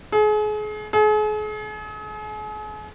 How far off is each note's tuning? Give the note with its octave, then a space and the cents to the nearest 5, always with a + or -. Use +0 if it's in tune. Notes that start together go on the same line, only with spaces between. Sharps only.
G#4 +35
G#4 +40